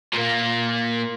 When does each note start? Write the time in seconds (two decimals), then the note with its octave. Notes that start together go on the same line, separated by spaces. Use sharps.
0.13 A#2 A#3